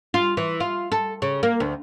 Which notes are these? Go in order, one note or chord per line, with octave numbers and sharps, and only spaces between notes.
F4
E3
F4
A4
C#3
A#3
D2